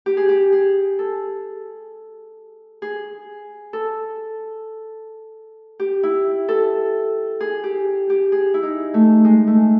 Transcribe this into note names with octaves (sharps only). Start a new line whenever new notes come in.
G4
G#4
G4
G#4
A4
G#4
A4
G4
E4
A4
G#4
G4
G4
G#4
E4
D#4
A3
G#3
A3